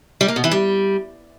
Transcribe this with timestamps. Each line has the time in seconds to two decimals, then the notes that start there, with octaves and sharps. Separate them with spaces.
0.21 G3
0.28 A#3
0.36 B2
0.44 E3
0.51 G3